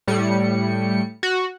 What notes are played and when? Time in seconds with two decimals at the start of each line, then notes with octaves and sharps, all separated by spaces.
0.08 A2 G3 C#7
1.23 F#4